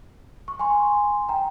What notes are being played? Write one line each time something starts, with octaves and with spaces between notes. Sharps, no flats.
C#6
G#5 C6
G5 A#5